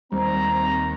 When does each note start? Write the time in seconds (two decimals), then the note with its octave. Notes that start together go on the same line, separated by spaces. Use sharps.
0.12 D#2 G3 C4 A#5